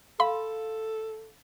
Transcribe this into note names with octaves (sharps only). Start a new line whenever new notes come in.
A4 F5 B5 C6